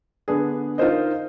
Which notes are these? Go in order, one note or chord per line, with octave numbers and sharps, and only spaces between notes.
D3 B3 D4 G#4
D#4 F4 A#4 C5 D#5